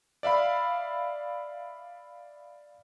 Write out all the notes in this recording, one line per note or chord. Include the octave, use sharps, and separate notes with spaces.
D5 E5 F5 B5